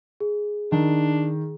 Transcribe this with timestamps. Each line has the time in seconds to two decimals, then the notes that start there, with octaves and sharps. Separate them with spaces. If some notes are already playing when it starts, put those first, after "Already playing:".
0.20 G#4
0.72 D#3 D4